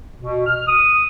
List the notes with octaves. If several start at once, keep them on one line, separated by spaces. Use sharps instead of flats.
B2
F6
D#6